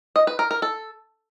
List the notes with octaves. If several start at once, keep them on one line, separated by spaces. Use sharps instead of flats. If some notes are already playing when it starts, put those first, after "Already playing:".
D#5
B4
A#4
A#4
A4